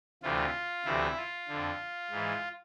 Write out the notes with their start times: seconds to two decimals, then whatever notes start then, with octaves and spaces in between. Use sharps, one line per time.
0.23 D2 C3 E3 F4
0.85 D2 C3 E3 E4
1.17 F4
1.48 F2 D3
2.11 G#2 E3